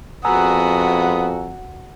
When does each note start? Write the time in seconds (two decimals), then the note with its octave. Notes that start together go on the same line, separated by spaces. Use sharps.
0.25 F2 G#3 B3 F#4 G#5 A#5 D#6 E6